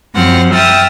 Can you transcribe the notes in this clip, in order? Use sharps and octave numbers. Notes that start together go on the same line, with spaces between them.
F#2 F3 C4 F#5 F6
E5 G5 D#6 F6 A6